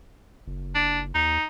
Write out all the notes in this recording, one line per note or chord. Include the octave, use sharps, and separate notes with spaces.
F#1
D4
D#2 D#4